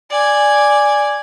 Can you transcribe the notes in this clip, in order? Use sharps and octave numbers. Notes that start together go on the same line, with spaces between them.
D5 G#5